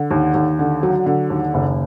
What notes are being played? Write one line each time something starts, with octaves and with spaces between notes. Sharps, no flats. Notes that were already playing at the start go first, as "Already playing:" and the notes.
Already playing: D3
D#2
D#2
D3
F#3
D3
D#2
F#1